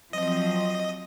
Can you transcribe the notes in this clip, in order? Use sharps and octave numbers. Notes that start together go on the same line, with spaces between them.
F3 F#3 C4 D#5